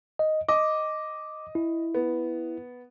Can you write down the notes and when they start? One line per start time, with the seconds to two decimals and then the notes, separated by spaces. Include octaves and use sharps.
0.19 D#5
0.49 D#5 D6
1.55 E4
1.94 B3